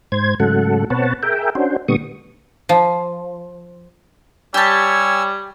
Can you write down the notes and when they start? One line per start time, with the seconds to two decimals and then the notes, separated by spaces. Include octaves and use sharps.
0.12 G#2 C5 G#6
0.40 G#2 C#3 F#3 A3 A4 F#5
0.90 B2 C4 B4 C#5 F#5 A5
1.23 G#4 A#4 E5 G5
1.55 C#4 D4 F#4 C5
1.88 A#2 D3 G3 B3 C#6 D#6
2.69 F3
4.54 G3 G4 C#5 G#5 A5 E6